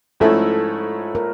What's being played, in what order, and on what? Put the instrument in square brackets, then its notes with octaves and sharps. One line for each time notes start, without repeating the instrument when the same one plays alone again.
[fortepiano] G#2 F3 A3 C#4 E4 [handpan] A4
[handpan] A#4